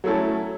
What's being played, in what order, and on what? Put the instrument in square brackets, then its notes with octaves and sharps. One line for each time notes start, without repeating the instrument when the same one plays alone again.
[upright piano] F#3 A3 C#4 E4 A4